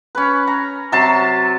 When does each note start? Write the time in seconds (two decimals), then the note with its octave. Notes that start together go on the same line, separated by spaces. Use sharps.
0.15 C#4 B4
0.47 A#5
0.92 C3 F#3 A5 C6